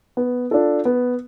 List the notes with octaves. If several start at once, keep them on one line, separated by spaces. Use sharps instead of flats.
B3
D4 F4 A4
B3